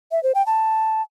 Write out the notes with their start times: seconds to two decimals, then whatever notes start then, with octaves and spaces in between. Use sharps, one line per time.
0.12 E5
0.23 C5
0.35 G5
0.46 A5